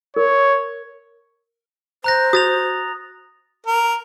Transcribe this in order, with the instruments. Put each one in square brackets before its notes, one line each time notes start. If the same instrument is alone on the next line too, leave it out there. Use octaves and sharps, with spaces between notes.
[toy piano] A#4 [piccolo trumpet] C#5
[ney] C5 [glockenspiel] A#5 F#6 A#6
[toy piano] F#4 [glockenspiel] D#6 A6 F7
[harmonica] A#4